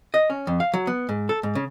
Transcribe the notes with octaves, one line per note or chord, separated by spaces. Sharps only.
D#5
C#4
F2
F5
F#3
B3
G#2
A4
G#2
C#3